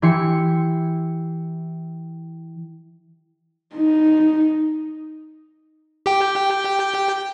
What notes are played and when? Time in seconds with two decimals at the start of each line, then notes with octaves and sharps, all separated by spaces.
0.02 E3 E4 G4 C6 C7 C#7
3.75 D#4
6.06 G4 G5